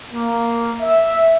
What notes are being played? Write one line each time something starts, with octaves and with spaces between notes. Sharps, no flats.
A#3
E5